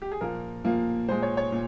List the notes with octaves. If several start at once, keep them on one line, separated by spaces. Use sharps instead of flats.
G4
G#4
A#2 F3 A#3 A#4
A#2 F3 A#3
A#2 G#3 C5
C#5
C#5
A#2